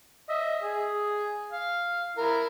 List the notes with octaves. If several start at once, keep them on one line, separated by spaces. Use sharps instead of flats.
D#5 E5
G#4
F5
E4 A#4